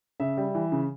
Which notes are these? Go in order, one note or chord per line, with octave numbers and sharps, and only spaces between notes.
C#3 E5
G3
E3
C#3